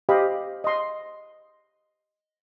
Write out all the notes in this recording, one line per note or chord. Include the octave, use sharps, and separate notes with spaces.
G4 C5 D#5 F5 B5
D#5 C6